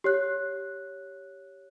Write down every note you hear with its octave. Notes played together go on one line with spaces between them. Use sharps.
G4 C#5 F#6